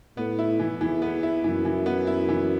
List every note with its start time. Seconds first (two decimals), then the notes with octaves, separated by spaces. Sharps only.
0.17 A2 B3
0.39 E4
0.59 E3
0.81 E2 E3
1.02 B3
1.23 E4
1.44 F#2 E3
1.65 E3
1.86 B3
2.07 E4
2.29 E3